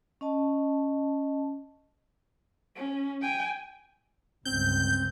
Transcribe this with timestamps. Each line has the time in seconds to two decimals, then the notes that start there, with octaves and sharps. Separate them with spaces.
0.21 C#4 D#5 A5
2.76 C#4
3.22 G5 G#5
4.45 G1 C#2 C4 G6